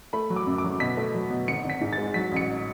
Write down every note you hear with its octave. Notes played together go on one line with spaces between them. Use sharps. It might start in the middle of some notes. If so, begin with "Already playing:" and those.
A3 B5
F#3
D6
F#2
D6
F#3
B2 B6
A3
F#3
B2
G#1 C#7
G#1
B6
G#2
A6
G#3
F#3 B6
A1 C#7